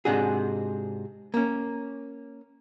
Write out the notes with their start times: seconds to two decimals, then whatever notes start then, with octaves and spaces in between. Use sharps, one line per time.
0.05 G#2 C3 D4 F#4 G#4
1.34 A#3 C#4